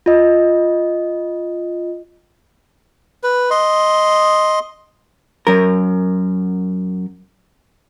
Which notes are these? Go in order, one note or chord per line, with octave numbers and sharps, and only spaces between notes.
F4 D#5
B4
D#5 C6
F#2 A#4